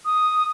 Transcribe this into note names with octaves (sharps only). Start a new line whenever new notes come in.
D#6